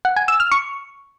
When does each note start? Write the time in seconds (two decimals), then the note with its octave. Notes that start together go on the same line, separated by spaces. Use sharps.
0.05 F#5
0.16 G#5
0.28 E6
0.40 F6
0.51 C#6